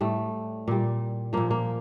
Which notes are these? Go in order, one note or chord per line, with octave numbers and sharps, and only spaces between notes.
A2 G3 A3
A#2 G3
A#2 F3 A#3
A#3